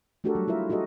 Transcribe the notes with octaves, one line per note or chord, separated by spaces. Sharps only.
A3 D4 F#4 G4 A4 A#4
F#3 G3
E4 F4 A#4 E5
D#4 F#4 G4 A4 D#5